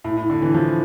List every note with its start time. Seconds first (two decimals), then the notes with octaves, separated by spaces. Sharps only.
0.04 A2
0.17 A2
0.30 D3
0.42 E3
0.54 F3